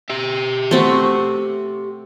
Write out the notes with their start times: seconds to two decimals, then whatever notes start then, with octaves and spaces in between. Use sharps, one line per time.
0.10 G4 E5
0.71 A3 C4 F#4